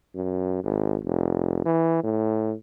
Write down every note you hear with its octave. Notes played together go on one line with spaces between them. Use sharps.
F#2
G#1
F1
E3
A2